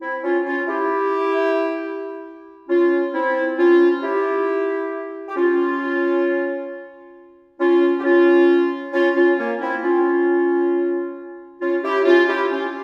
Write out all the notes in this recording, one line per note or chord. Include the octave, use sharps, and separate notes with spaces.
C4 E4
C#4 F4
C#4 F4
E4 G4
C#4 F4
C4 E4
C#4 F4
E4 G4
G4
C#4 F4
C#4 F4
G4
C#4 F4
C#4 F4
C#4 F4
A#3 C#4
C4 E4
C#4 F4
C#4 F4
E4 G4
C#4 F4
E4 G4
C#4 F4